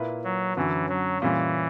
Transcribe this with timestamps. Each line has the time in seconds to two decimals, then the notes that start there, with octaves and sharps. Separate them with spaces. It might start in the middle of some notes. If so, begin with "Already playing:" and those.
Already playing: A#2 A#3 E4 B4
0.24 F#3
0.56 F#2 D3 E3 F#3 C#4
0.89 F#3
1.22 A#2 E3 G3 C#4